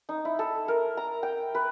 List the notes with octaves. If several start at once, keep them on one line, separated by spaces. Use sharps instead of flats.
D#4
E4
A4
A#4
A#5
G5
B4